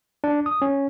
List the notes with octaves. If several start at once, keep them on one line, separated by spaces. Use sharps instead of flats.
D4
D#6
C#4